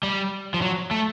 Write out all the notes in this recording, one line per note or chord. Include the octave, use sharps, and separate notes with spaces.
G3
F3
F#3
A3